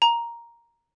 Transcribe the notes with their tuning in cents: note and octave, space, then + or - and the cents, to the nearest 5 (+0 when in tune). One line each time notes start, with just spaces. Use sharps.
A#5 +5